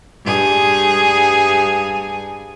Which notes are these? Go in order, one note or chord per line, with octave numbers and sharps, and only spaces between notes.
G2 G#4